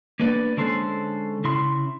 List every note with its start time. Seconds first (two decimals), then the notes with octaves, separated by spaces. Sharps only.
0.20 A#3 B3 D4 B4 D5
0.57 D3 G#3 C#4 D4 A4 C5
1.44 C#3 E4 C6